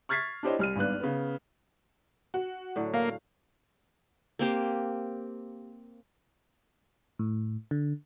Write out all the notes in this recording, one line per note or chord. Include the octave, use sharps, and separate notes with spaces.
C#6 F6 G#6 A6 B6 C7
D4 E4 G4 C5 C#5 D#5
C2 F6 D#7
G#1 G2 B3 F#6
C#3 B3
F#4
A2 D3 F#3
A#3 F5
A#3 C4 G4
A2
D3